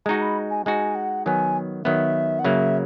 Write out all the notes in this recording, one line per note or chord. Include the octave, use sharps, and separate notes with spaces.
G#3 D#4 F#4 A#5
B5
G#5
G#3 D#4 F#4 G#5
F#5
D#3 F#3 B3 G#5
D#3 F#3 B3 E5
F#5
C#3 F#3 A#3 E5